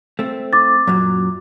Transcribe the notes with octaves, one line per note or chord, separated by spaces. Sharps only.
A3 C4
D6 A6
F#2 A#2 F#3